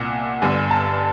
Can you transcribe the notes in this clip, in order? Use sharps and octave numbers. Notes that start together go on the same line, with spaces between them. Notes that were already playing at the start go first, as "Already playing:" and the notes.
Already playing: C2 A#2 F#5
G1 G2 D3 G#5
A5